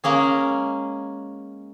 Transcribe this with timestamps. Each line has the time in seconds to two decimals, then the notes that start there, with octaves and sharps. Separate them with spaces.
0.04 G#3 A#3 C#4 G#4